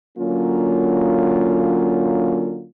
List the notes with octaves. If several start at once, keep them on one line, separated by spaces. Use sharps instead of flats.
D3 F#3 A#3 C#4 F4